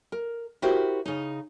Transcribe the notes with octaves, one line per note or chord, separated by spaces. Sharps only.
A#4
E4 F#4 G4 A#4 C5
C#3 D#4